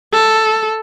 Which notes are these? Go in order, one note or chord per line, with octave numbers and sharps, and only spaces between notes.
A4